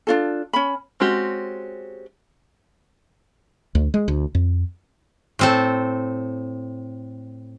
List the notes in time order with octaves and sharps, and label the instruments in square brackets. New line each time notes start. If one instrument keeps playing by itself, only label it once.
[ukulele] D4 F4 A4
C#4 B5
[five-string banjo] G#3 C4 C#4 F#4 G4
[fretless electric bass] D2
G#3
D2
F2
[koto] A2 C4 A4